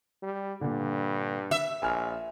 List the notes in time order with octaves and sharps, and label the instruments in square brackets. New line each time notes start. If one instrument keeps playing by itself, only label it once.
[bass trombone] G3
[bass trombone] G2 [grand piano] A#2 D3
[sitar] E5
[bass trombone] A#1 [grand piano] G#5 F6